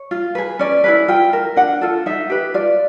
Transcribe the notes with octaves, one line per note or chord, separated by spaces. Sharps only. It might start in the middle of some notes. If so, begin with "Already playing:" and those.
Already playing: C#5
F4
G#4 B4
C#4 D5
E4 G#4 B4
F4 G5
A#4
D4 F#5
F4 A4
D#4 E5
G4 B4
F4 D5